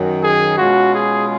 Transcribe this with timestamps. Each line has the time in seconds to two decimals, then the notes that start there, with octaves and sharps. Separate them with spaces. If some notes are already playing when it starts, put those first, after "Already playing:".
Already playing: F#2 D#3 F#3
0.22 G#4
0.57 B2 G#3 C#4 F4 F#4
0.93 G#4